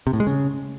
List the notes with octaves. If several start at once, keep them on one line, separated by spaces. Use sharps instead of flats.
C3
A2
G#3
C#3